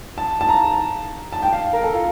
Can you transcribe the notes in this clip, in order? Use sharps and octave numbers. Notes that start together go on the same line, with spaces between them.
A5
A5
A#5
A5
G5
F5
A#4
A4
F4